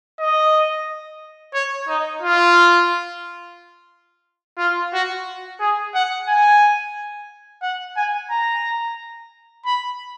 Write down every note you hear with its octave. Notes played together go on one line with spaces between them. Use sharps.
D#5
C#5
D#4
F4
F4
F#4
G#4
F#5
G#5
F#5
G#5
A#5
B5